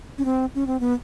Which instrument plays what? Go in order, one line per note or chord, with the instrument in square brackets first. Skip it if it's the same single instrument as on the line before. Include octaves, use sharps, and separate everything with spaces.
[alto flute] C#4
C4
C#4
C4
B3